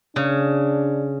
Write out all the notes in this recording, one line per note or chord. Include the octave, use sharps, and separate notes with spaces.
C#3 D4